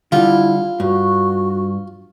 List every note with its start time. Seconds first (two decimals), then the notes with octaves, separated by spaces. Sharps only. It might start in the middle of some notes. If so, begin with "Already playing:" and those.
0.12 D3 G3 E4 F4
0.80 G2 F#4